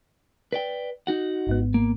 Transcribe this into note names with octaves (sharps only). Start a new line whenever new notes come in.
B4 D5 G5
D#4 F#4 F#5
G#1 G#2 B3
A#3